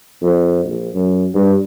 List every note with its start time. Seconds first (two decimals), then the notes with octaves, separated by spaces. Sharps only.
0.22 F2
0.64 A#1
0.94 F#2
1.35 G2